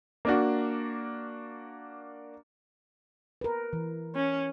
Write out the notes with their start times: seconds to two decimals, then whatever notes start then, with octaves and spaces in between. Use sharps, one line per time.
0.25 A#3 D4 F#4
3.41 A#4 B4
3.73 E3
4.15 C#4